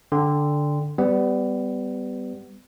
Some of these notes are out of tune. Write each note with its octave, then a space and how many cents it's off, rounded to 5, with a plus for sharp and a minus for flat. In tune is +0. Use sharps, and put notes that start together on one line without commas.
D3 +0 G5 +10 C6 -15
G3 +0 B3 +25